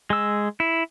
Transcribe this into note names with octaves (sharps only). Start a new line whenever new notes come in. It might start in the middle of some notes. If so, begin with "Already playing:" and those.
G#3 E6
E4